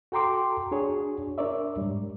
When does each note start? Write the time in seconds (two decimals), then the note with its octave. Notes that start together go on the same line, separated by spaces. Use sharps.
0.12 F#4 A4 G5 A#5 C6 D6
0.71 D4 F#4 G#4 C#5
1.38 D4 A#4 C#5 D5 E5
1.77 G#2 G3